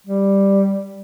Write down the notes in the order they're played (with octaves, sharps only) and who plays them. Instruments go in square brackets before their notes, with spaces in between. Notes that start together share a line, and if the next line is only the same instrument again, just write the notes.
[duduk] G3